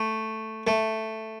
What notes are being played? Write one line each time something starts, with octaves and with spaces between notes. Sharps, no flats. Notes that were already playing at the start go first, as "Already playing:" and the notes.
Already playing: A3
A3